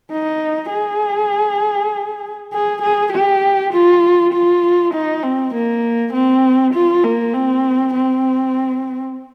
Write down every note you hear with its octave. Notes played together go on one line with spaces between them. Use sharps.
D#4
G#4
G#4
G#4
G4
F4
F4
D#4
C4
A#3
C4
F4
A#3
C4
C4